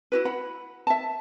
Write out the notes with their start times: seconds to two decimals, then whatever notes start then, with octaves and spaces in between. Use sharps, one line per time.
0.12 E4 F#4 B4
0.25 F#5 B5
0.87 E5 A5